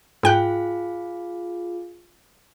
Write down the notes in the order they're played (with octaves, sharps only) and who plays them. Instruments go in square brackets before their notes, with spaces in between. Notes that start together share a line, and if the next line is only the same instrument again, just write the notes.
[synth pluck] G#2 G5 F#6 [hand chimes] F4 G#4 F5